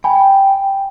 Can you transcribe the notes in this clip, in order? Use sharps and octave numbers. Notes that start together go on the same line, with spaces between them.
G5 G#5 B5